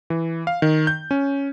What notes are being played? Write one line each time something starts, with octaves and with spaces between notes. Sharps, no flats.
E3
F5
D#3
G6
C#4